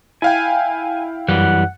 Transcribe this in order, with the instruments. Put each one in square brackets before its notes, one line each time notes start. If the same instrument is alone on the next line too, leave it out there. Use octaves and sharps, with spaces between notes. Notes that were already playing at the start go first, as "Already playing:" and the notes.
[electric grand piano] E4 F5 G5 [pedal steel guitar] G#5
[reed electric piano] F#2 [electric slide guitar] E3 G3 [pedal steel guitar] F#5